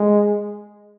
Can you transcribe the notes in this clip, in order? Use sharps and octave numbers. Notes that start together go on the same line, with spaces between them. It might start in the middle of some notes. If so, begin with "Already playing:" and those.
Already playing: G#3